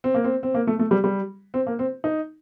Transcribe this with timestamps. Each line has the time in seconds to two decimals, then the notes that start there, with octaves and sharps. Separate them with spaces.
0.04 C4
0.14 A#3
0.24 C4
0.43 C4
0.54 A#3
0.67 A3
0.79 A3
0.91 G3
1.04 G3
1.54 C4
1.67 A#3
1.79 C4
2.04 D#4